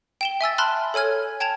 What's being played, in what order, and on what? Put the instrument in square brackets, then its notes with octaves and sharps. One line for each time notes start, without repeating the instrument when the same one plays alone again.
[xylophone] G5 E7 G7
E5 G#5 E6 A6
A5 B5 C6 F6 F#6
A4 C#5 G#5 F6 G#6
G5 A5 G#6 E7 F7